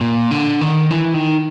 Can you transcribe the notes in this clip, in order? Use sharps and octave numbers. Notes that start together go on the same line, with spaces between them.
A#2
D3
D#3
E3
D#3